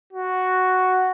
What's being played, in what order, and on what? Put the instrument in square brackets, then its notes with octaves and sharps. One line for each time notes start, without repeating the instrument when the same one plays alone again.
[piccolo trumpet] F#4